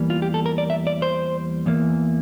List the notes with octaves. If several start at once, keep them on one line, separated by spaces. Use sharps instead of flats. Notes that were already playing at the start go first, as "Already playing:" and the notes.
Already playing: E2 E3 G3 A#3
F4
G4
A4
A#4
D5
E5
D5
C5
E2 E3 A#3